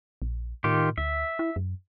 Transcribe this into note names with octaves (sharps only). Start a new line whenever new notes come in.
A#1
A2 D#3 F4 G4
D2 E5
E4
F#2